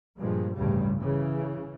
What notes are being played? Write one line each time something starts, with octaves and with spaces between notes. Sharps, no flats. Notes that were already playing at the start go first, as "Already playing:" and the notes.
G2 A#2 F3 G#3
A1 D2 G2 C#3 G3
C#3 E3